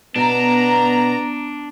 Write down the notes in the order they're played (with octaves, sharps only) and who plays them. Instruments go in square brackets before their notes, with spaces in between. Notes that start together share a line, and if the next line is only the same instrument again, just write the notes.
[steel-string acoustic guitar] B2 [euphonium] B3 [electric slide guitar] D4 [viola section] A#5